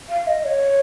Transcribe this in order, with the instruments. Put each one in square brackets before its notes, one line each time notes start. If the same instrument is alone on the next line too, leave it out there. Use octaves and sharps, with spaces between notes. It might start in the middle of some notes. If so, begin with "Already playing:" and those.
[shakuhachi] F5
D#5
C#5